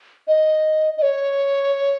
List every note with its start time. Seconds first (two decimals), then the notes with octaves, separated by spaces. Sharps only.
0.28 D#5
0.97 D#5
1.02 C#5